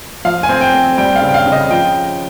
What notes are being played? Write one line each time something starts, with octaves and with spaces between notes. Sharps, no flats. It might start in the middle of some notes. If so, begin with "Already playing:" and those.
F3 F5
G#5
C4
G5
C4
G3 G5
F5
C#3
G5
F5
C#3
D#5
F3 G5